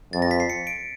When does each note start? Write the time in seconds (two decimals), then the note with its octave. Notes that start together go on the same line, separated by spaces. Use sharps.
0.13 F2 A6
0.22 A#6
0.31 B6
0.40 C7
0.50 C#7
0.67 D7